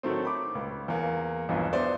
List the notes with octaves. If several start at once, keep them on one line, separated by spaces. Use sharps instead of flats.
A2 D#3 F#3 A3 C4
B5 D6
C#2
E2 A#3
B1 E2 G2 F3
B3 C5 D5 E5